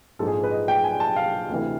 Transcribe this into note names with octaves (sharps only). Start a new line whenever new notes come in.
A#1 G#2 F3 G#3 A4
G#4
B4
D#5
G5
G#5
A5
F5
D2 C3 E3